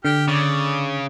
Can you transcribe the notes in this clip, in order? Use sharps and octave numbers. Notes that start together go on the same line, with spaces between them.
D3 G4 G5 F6
C#3 D5